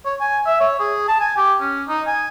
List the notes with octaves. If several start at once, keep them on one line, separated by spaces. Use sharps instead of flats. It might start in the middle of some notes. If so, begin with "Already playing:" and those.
C#5
G#5
E5
C#5
G#4
A5
G#5
G4
C#4
D#4
G#5